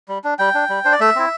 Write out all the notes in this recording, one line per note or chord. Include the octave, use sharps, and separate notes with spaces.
G3
D4
G3 G5
D4
G3
D4 C5
D5
A3 E5
C4 E4